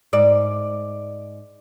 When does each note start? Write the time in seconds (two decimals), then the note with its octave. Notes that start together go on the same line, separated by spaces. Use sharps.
0.13 G#2 D5